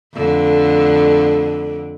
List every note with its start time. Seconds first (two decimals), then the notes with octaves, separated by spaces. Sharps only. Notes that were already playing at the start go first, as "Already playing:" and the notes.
0.15 F2 D3 A3